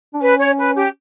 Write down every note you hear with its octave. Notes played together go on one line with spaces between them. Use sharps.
D4
C#4 B4
C#5
B4
G4